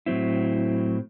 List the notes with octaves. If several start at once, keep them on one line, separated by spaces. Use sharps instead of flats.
A2 F#3 C4 E4